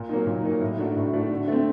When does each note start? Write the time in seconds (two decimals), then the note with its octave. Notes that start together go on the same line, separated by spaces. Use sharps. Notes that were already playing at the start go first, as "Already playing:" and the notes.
Already playing: A#2
0.09 F#3 A#3 D#4
0.27 A#2
0.44 F#3 A#3 D#4
0.61 A2
0.78 A3 D4 F#4
0.96 A2
1.13 A3 D4 F#4
1.31 D3
1.48 A3 C4